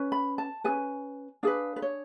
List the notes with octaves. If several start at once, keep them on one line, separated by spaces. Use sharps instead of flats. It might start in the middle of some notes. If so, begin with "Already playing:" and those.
Already playing: C#4 B4
B5
A5
C#4 G#4 B4 G#5
D4 G#4 B4 F5
B4
C#5